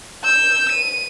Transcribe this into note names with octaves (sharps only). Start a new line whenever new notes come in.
E6 G6
D#7